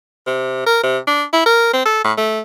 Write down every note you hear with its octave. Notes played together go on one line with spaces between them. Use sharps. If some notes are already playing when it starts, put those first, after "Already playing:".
C3
A#4
C3
D4
E4
A#4
C4
A4
A2
A3